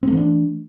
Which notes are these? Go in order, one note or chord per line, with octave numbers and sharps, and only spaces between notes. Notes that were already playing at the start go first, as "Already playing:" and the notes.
E3 A3 C4 D4